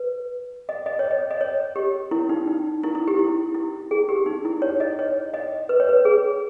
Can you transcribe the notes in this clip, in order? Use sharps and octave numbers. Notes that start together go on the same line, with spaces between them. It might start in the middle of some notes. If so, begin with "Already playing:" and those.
Already playing: B4
D#5
D#5
C#5
D#5
D#5
C#5
G4
E4
D#4
D#4
E4
E4
G4
E4
E4
G#4
G4
D#4
E4
C#5
D#5
C#5
D#5
B4
C#5
B4
G#4